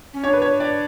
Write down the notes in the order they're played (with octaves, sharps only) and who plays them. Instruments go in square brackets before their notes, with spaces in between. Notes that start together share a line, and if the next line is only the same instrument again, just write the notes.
[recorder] C#4
[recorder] D4 [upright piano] C#5
[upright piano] B4
C#5
D5